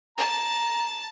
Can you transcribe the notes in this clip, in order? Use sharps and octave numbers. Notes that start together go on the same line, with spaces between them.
A5 A#5